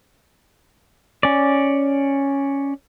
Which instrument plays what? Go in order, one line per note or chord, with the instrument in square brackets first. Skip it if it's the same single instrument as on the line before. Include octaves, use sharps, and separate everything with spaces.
[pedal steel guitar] C#4 D5